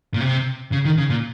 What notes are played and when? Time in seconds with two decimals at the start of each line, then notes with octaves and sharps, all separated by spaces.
0.14 A#2
0.21 C3
0.72 C#3
0.85 D#3
0.98 C#3
1.10 A#2